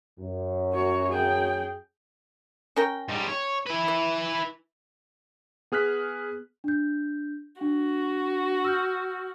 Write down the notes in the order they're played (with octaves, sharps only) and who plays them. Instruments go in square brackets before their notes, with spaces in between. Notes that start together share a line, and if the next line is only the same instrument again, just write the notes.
[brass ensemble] F#2
[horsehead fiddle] F#4 C#5
G#4 G5
[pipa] C#4 A#4 G5
[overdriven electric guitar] G#2 G3
C#5
E4 B4
[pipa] E3
[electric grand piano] B3 G#4 F6 F#6 B6
[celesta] D4 G6
[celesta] D4 [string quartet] F#4
[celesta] E6 F6 G6